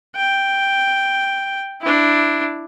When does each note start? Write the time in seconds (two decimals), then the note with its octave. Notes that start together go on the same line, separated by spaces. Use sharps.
0.15 G5
1.81 D4 E4